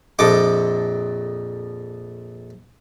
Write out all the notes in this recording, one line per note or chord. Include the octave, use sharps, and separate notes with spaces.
A#1 F2 A4 D#5 D6